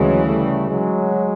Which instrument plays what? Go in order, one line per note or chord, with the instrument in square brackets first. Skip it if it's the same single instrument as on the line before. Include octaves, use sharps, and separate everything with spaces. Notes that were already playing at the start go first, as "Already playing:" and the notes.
Already playing: [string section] D2 C#3 E3 [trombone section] F#3 G#3
[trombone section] G3 A3
F#3 G#3